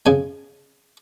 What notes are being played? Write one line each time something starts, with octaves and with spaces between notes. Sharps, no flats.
C#3 G#5